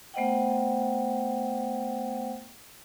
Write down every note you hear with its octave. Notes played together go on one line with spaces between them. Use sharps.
A3 B3 C5 D#5 F#5 G5